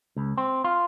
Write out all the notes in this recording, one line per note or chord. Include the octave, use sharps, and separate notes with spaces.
C#2
C4
F4